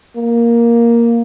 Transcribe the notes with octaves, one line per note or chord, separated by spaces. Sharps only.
A#3